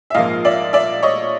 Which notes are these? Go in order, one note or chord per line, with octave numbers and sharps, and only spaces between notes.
E5
A#1 G#2 F3 A#3 D#5 F5
D5 E5
D5 E5
C#5 D#5